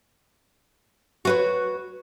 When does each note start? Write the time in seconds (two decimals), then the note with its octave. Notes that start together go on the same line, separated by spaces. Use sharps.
1.25 F#4 B4 C#5